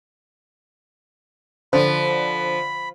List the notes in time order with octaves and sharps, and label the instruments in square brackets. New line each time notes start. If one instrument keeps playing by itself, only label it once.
[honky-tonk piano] D3 [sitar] F3 [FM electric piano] C5 [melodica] B5